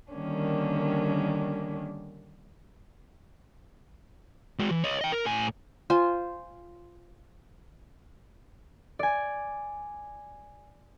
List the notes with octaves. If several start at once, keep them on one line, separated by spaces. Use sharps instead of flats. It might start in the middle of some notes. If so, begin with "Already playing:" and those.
D3 D#3 G3 A#3 C#4 D4
G#3 F#4
E3
C#5 D#5
D#5 G5
A#4
A2 G#5
F4 C5 G#5
D5 G#5